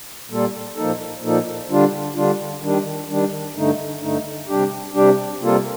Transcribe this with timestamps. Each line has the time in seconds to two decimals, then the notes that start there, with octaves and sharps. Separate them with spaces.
0.29 A#2 G3 A#3 F4 A4
0.76 A#2 F3 A#3 D#4 A4
1.22 A#2 F3 A#3 D#4 A4
1.69 D3 G3 D4 F4
2.15 D3 G3 D4 F4
2.61 D#3 G3 D4
3.08 D#3 G3 D4
3.55 G2 D3 A3 D#4
4.01 G2 D3 A3 D#4
4.48 C3 G3 D4 G4
4.94 C3 G3 D4 G4
5.40 C3 G3 A#3 F4 A4